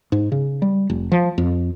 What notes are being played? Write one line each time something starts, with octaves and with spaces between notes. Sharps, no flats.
G#2
C#3
G3
F1
F3
F2